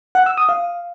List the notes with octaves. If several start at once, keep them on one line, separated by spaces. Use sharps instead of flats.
F#5
E6
D#6
F5